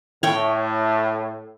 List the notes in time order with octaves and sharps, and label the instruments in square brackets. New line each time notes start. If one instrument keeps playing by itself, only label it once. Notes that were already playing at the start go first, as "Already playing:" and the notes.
[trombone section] A2 [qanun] C#5 G5